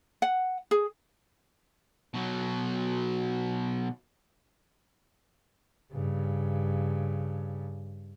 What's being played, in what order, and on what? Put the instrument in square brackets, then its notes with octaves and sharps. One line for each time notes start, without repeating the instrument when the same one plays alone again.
[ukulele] F#5
G#4
[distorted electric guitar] B2 F#3
[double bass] G2 C#3